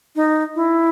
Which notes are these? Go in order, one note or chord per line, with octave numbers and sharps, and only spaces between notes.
D#4
E4